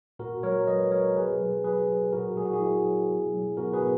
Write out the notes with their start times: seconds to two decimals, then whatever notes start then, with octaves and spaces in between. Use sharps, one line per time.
0.19 A#2 F#4 A#4
0.43 F#3 A#4 C#5
0.67 F#3 B4 D#5
0.92 F#3 A#4 C#5
1.16 B2 G#4 B4
1.41 F#3
1.64 F#3 G#4 B4
1.89 F#3
2.12 A#2 F#4 A#4
2.37 F#3 G#4
2.45 F#4
2.53 E4 G#4
2.61 F#3
2.85 F#3
3.09 B2
3.34 F#3
3.57 B2 F#4 A#4
3.73 G#4 B4
3.82 B2